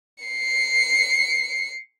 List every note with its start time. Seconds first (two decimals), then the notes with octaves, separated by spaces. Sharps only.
0.24 C7 C#7